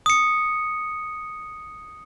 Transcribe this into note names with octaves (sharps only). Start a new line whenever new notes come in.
D#6 C#7